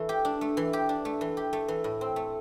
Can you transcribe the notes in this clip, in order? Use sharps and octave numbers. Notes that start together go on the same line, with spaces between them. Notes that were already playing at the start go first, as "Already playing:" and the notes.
Already playing: E3 A3
G4
D4
A3
E3
G4
D4
A3
E3
G4
A3
E3
A2
C4
A3